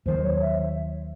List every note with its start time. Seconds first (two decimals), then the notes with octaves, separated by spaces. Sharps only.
0.06 D#2 D#3 F#3 C5
0.23 C#5
0.41 E5